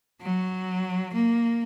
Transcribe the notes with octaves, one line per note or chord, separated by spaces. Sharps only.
F#3
A#3